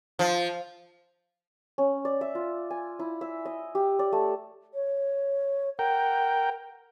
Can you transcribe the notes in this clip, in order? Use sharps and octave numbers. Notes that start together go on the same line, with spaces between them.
F3
C#4
D5
E5
F4
G#5
E4
E5
D#5
G4
D5
A3
C#5
A#4 F#5 G5